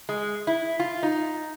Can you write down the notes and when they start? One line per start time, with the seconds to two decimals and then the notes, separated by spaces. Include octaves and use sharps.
0.09 G#3
0.47 E4
0.80 F4
1.03 D#4